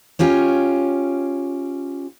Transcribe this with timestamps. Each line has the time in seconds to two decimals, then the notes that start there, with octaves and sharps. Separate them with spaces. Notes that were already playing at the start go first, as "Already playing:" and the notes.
0.19 C#4 F4 G4 C#5